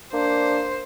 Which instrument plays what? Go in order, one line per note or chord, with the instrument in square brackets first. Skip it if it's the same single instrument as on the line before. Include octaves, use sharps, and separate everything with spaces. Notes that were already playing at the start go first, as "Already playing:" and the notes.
[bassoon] A#3 [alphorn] D4 [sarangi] C5